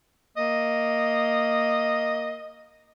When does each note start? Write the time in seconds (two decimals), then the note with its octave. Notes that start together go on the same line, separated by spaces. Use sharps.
0.37 A#3 D#5